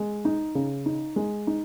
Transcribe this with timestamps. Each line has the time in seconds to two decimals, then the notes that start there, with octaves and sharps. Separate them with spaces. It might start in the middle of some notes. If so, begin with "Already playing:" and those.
Already playing: G#3
0.25 D#4
0.55 C#3
0.86 D#4
1.16 G#3
1.47 D#4